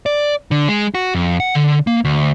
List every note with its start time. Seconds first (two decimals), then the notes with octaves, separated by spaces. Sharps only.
0.06 D5
0.51 D3
0.68 G#3
0.95 F#4
1.15 F2
1.40 F#5
1.55 D3
1.87 A#3
2.05 D2